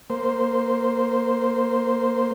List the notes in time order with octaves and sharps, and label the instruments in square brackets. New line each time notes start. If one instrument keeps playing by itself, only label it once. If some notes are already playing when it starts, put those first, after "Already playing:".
[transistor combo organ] A#3 C5